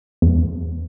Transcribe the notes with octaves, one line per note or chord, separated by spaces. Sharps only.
E2